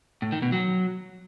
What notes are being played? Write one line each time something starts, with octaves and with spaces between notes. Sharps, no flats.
A2
D#3
B2
F#3